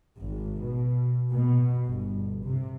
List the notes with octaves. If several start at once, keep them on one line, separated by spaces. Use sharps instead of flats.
G#1
B2
B2
G1
C3